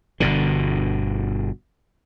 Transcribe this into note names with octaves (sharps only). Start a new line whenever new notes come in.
G1 B2 D3